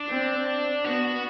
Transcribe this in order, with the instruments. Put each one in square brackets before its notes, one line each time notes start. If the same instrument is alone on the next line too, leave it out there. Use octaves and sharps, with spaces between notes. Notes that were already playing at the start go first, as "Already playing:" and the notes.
Already playing: [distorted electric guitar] D4
[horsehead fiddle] C4
[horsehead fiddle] B3 [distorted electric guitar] F#4